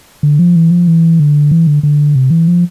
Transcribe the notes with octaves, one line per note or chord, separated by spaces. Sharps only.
D3
F3
E3
F3
E3
D3
E3
D3
D3
C3
E3
F3